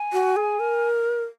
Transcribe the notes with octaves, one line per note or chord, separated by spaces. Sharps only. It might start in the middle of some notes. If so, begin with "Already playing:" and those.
Already playing: G#5
F#4
G#4
A#4